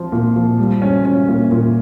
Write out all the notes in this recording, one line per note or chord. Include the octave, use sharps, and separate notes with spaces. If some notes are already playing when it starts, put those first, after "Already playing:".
Already playing: F3 C4 F4
A#2
F3
G3
C#4
C#4
A#2
A#2